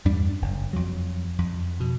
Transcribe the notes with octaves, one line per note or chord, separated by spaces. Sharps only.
E2 G2 G3 D4
F#1
F2 F#3
F2
B2